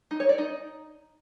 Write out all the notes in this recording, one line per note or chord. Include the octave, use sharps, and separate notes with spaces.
D#4
C#5
D5
D#4